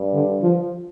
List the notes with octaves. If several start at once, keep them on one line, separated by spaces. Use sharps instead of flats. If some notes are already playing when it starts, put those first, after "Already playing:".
Already playing: G2
D3
F3